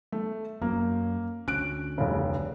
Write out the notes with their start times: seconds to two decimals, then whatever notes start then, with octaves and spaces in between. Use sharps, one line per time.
0.12 A3
0.62 F#2 A#3
1.48 D2 C#4 F#6 D7
1.98 F1 C2 C#3